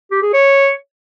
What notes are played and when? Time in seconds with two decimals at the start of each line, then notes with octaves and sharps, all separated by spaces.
0.11 G4
0.22 G#4
0.33 C#5